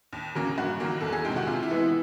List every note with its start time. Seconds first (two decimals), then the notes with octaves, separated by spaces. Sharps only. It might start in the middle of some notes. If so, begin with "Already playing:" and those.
0.13 D#2
0.35 C#3 F#3 A#3 C#4
0.58 G2 F#4
0.80 D#3 F#3 A#3
1.01 E2 A4
1.13 G#4
1.25 C3 D#3 G#3 G4
1.36 F#4
1.47 C3 F4
1.63 E4
1.70 E3 G#3 B3
1.77 E4